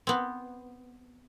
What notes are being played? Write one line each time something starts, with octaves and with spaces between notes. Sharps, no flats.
B3 C4